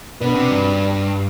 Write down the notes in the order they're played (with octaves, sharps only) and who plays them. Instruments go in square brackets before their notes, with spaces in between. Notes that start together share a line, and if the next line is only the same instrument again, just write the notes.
[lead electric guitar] B2 [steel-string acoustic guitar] B3 D4 F#4 B4 D5
[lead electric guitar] C3
G2